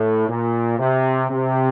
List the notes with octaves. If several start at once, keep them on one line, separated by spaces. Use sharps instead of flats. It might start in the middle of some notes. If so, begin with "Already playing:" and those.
Already playing: A2
A#2
C3
C3